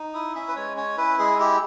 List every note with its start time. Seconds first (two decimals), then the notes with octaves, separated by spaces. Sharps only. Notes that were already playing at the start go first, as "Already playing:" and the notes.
Already playing: D#4
0.14 E4 D#6
0.35 C#4 E5
0.48 B4
0.56 G#3 C#5
0.77 C#4 C#5
0.97 E4 B4
1.19 G#3 G#4
1.39 E4 G4